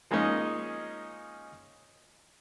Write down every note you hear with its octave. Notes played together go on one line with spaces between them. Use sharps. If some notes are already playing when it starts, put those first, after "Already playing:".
F3 G#3 A#3 C#4 D#4